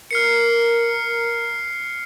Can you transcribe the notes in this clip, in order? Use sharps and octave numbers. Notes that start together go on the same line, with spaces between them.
A#4 F6 C7 C#7